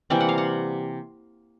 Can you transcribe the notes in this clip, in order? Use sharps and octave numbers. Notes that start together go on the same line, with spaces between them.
C3 E3 G3 A#3 G5
F#5
F5
F#5